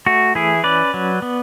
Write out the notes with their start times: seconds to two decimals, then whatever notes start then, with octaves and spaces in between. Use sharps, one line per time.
0.06 A3 F#4
0.35 E3 E4 G#4
0.64 C#4 B4 D5
0.94 F#3
1.22 B3